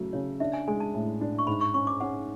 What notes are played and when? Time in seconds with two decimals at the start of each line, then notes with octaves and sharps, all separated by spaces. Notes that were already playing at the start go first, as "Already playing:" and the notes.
Already playing: C#3 F#3 A3
0.13 C#3 C#5
0.40 D4 E5
0.54 G#5
0.68 G#3 G#5
0.80 A5
0.94 A2
1.21 D4
1.39 C#6
1.47 G#2 B5
1.61 C#6
1.74 C#4 C#6
1.87 D6
2.01 C#4 F#5